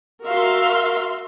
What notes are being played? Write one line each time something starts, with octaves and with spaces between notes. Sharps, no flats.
F#4 A#4 E5 F5 C6